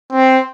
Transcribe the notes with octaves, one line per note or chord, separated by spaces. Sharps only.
C4